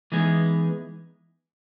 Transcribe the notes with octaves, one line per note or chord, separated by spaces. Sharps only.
E3 G#3 B3 D#4 G#4